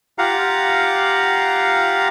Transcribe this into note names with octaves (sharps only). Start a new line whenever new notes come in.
F4 G4 F5 F#5 A#5